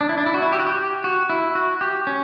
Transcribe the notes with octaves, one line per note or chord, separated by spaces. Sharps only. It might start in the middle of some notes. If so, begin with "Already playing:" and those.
D4
E4
D4
E4
F#4
E4
G4
F#4
G4
F#4
E4
F#4
G4
C#4